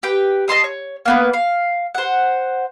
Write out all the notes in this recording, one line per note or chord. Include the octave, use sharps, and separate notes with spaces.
G4 B4 G5
D#5 A5 C6 D#6
C#5
A#3 B3 B4
F5
C5 F#5